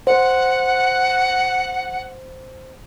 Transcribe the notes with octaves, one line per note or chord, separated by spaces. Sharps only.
C5 F#5